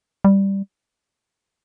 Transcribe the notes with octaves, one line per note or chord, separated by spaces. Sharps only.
G3